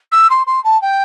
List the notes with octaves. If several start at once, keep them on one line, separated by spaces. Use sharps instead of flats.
E6
C6
C6
A5
G5